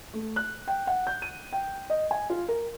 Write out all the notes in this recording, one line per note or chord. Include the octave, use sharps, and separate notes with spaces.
A3
F#6
G5
F#5
G6
D#7
G5
D#5
G#5
F4
A#4